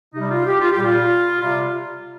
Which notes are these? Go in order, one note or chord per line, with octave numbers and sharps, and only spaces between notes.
C3 G3 D#4
F4
G4
F4
G4
A#2 G3 F4
C3 G3 F4